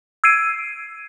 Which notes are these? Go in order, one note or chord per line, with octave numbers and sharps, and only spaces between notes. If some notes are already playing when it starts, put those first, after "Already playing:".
E6 G#6 C7 D7 D#7